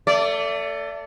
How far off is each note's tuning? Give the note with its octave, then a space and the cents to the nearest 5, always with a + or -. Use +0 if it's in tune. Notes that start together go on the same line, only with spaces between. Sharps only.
A3 +20 D5 -25